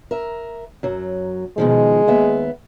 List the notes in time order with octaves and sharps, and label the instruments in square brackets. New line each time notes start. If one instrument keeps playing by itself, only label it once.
[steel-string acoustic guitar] A#4 E5
F#2 F#3
[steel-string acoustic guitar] B2 D#3 F3 [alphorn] G#3
[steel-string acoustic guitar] D#2 B3 E5